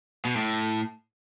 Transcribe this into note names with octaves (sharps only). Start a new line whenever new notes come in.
B2
A2